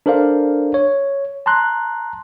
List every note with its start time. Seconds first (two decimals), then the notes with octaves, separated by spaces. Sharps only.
0.06 D4 A4 A#4 C5 D5 F5
0.74 C#5
1.46 A5 A#5 C6 F#6